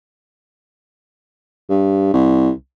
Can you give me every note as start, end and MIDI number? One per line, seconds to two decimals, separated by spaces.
1.70 2.10 43
2.14 2.50 36